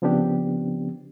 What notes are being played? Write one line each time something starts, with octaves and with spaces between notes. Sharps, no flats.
C#3 F3 B3 C4 D4 G4